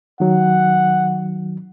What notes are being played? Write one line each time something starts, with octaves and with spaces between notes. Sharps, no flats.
D#3 F#3 F#5